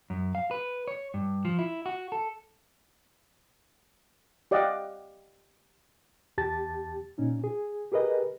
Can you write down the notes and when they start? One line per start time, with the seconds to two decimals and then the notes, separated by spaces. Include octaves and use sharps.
0.10 F#2
0.35 F5
0.51 B4
0.88 C#5
1.14 G2
1.45 F3
1.59 E4
1.86 F#4
2.12 A4
4.51 G4 D5 D#5 F5 F#5
6.38 E2 G4 A5 A6
7.18 A#2 C#4 D#4
7.44 G#4
7.92 G4 G#4 A#4 B4 D#5